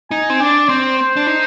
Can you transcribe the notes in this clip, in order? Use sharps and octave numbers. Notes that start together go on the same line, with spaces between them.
D#4 G#5
C4
D4 D5
C4 C5
C5
D4
D#4